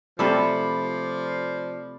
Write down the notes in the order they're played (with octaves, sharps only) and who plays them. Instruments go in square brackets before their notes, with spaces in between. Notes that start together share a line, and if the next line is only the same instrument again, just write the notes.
[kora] C3 A3 A4 [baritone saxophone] F3 [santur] D5 B5 D6